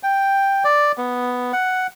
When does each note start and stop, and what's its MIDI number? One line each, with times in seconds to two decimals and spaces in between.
0.03 0.64 79
0.64 0.92 74
0.97 1.52 59
1.53 1.87 78